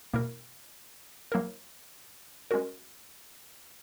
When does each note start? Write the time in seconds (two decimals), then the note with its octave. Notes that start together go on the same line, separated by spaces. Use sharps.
0.14 B2 A#3 E4 A#4
1.32 F#3 A#3 E4 A#4
2.51 G#3 C#4 F#4 A#4